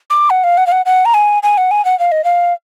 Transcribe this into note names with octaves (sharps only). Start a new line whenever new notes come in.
D6
F#5
F5
F#5
F5
F#5
F#5
A#5
G#5
G#5
F#5
G#5
F#5
F5
D#5
F5